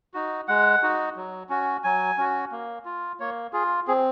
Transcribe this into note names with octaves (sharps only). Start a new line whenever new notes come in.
D#4 F#4
G#3 F#5
D#4 F#4
F#3
C#4 F#4
F#3 G#5
C#4 F#4
A#3
F4
A#3 C#5
F4 G#4
C4 G#4